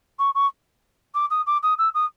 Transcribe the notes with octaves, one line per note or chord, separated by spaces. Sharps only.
C#6
C#6
D6
D#6
D6
D#6
E6
D#6